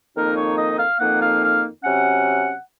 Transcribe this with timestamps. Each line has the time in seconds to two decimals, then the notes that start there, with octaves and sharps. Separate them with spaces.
0.16 F2 D#3 A#3 D#4 A#4
0.37 C#5
0.58 D#5
0.79 F5
1.00 F2 D#3 A#3 D#4 F#5
1.21 F5
1.43 F5
1.84 C3 F#3 C#4 F#5